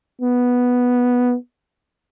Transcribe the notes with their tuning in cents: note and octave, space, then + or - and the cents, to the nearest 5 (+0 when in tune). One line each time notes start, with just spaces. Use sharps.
B3 -5